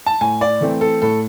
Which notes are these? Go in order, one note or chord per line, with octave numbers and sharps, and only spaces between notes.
A5
A2 G#5
D5
E3 A3 C4
A4
A2 A4